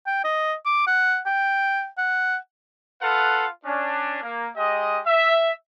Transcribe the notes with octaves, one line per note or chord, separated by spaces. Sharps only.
G5
D#5
D6
F#5
G5
F#5
F4 A4 B4 F5 F#5
C#4 D4
A#3
G#3 G4 D#5
E5